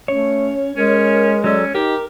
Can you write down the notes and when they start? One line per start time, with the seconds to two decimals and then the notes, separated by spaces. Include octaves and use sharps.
0.08 A3 C#4 C#5
0.76 G#3 C#4 A#4
1.44 F#3 C#4 A4 D5
1.75 D#4 G4 A#4